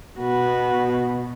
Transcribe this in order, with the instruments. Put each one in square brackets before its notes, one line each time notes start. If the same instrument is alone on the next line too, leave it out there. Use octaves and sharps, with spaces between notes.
[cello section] B2 [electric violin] F#4 B4